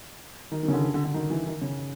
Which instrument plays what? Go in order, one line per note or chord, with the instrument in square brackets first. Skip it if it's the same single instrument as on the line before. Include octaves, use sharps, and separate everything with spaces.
[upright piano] D#3
D#3
C#3
D3
D3
D3
D3
D#3
E3
D#3
C#3